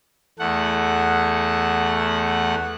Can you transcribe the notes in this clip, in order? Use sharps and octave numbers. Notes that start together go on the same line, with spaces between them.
E2 A3 F#5